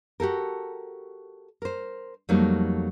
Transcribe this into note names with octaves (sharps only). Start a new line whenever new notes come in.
F#4 G4 A4 A#4
A#4 C5
F2 F#3 G3 A3 A#3 D#4